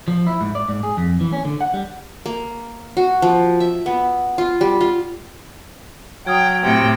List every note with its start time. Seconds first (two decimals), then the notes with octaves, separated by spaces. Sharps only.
0.08 F3
0.27 E4
0.41 G#2
0.55 D5
0.68 G#2
0.83 G#4
0.97 F2
1.21 E3
1.33 C#4
1.45 D3
1.61 F#5
1.74 G3
2.26 A#3
2.97 F#4
3.22 F3
3.60 E5
3.86 B3
4.38 F4
4.61 G3
4.81 F4
6.27 F#3 G5 D#6 F6 G#6
6.64 A2 C3 G5